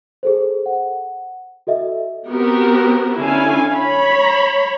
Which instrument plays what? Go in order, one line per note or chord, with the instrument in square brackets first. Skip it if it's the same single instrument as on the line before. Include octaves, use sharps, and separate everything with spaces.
[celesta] G#4 A4 C5
F#5
F#4 A4 D#5 E5
[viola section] B3 C4 F#4 G4 A#4
D3 C#4 E4 F5 G#5
C#5 B5